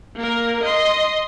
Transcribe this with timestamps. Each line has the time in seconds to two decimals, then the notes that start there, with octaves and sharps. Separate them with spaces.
0.16 A#3 A#4
0.63 D#5 C6